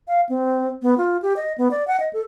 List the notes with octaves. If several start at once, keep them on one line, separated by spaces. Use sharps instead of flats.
F5
C4
B3
F4
G4
D#5
B3
D5
F#5
D#5
A4